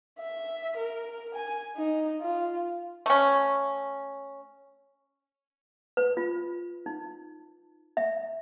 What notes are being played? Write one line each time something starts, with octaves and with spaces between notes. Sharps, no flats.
E5
A#4
G#5
D#4
F4
A3 C#4
B4
F4
D#4
E5